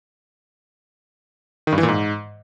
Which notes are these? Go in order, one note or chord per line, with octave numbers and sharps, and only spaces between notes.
D#3
G2
E3
A#2
G#2